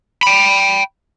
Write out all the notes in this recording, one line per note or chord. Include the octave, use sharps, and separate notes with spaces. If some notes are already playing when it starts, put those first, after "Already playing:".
G5 B5